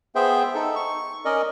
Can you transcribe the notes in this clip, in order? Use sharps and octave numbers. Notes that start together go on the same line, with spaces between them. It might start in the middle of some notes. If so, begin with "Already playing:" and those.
B3 G#4 C5 E5 G5
D#4 A4
C#6
C#4 A#4 D5 D#5